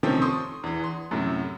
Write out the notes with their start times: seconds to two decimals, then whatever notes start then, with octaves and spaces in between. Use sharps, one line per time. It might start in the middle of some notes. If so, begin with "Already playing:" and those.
0.03 C3 D#3 F3 A3 C4 C#4
0.22 C6 C#6 D#6
0.64 E2 E3
0.84 C6
1.11 F#2 A2 C3